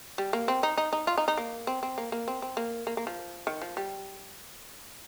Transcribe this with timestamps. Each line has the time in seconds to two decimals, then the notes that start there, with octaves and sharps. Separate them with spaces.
0.18 G3
0.33 A#3
0.48 C4
0.63 D#4
0.78 D#4
0.93 D#4
1.07 F4
1.18 D#4
1.28 D#4
1.38 A#3
1.67 C4
1.83 C4
1.98 A#3
2.12 A#3
2.28 C4
2.42 C4
2.57 A#3
2.87 A#3
2.97 A#3
3.07 F3
3.47 D#3
3.62 F3
3.77 G3